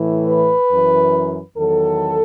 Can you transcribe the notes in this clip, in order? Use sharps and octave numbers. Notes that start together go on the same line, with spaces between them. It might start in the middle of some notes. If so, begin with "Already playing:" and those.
Already playing: A2 E3
B4
F#2 E3
E2 D#3 F#3 A4